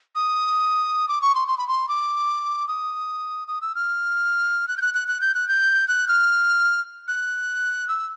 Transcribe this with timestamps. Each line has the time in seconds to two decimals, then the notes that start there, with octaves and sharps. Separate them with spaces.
0.15 D#6
1.08 D6
1.22 C#6
1.35 C6
1.48 C6
1.58 B5
1.68 C6
1.88 D6
2.68 D#6
3.48 D#6
3.61 E6
3.75 F6
4.68 F#6
4.77 G6
4.81 F#6
4.94 F#6
5.08 F#6
5.21 G6
5.35 F#6
5.48 G6
5.88 F#6
6.08 F6
7.08 F#6
7.88 E6